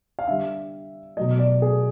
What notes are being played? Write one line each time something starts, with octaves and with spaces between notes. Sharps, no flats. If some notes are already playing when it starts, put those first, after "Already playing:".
F5
D3 G3 E5
B2 F#3 A3 D#5
D5
G#4